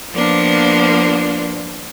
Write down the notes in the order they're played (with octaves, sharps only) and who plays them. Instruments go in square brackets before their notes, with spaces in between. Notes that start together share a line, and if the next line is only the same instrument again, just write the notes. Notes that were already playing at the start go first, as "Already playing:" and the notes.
[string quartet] F3 A#3 B3 D4